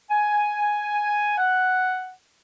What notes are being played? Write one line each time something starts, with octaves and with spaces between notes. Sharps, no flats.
G#5
F#5